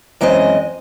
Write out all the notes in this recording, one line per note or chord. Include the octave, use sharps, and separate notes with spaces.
F#2 E3 G#3 C4 D#5